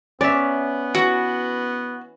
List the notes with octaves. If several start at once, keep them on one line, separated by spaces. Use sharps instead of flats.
B3 C#4 D5 E5
E3 F#4